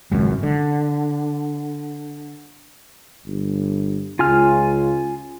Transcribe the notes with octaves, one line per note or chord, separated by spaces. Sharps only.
G#1 C#2 F#2
D3
G1
C#2 C#3 F4 G#5 F6